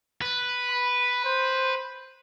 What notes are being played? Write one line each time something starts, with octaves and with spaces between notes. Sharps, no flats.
B4
B5
C5